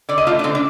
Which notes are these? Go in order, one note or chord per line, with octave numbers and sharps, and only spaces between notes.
D3 D5
D#5
A3 F4
D4
D3 C4
D4